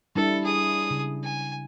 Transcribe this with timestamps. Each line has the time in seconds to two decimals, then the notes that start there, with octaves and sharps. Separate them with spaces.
0.16 G3 D4 E4 A4
0.44 G#4 D#6
0.90 C#3
1.23 G#5